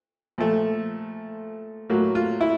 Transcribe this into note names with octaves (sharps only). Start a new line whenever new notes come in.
A#2 F3 A3
A2 F#3 A#3
F4
E4